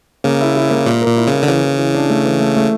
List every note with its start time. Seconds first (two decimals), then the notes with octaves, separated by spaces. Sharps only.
0.24 C#3 A#3
0.40 E4
0.56 E4
0.70 A#3
0.86 A#2 A#3
1.02 A#4
1.07 A#2
1.17 E4
1.27 C#3
1.32 A#3
1.43 D3
1.48 C#3 E3
1.63 E3
1.78 E3
1.94 D4
2.09 A3
2.25 E3
2.40 A3
2.56 A3